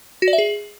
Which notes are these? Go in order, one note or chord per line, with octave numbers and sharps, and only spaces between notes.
F#4
D5
E5
G#4